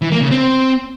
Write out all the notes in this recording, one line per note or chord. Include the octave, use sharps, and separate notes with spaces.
E3
A#3
C#3
C4